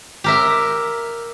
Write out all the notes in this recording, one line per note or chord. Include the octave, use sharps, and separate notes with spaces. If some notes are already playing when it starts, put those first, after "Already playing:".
G4 A#4 E5